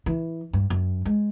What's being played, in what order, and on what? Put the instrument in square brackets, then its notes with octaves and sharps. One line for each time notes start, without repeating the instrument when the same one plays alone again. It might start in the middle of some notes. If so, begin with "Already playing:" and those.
[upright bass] E3
G2
F#2
G#3